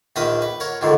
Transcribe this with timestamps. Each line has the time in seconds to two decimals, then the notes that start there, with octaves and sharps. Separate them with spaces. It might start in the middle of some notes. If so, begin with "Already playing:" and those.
0.16 A#1 D#3 A#4 B4 E5 D#6
0.42 B4
0.60 A#4 C#5 F#5
0.81 C#2 G#2 D3 D#3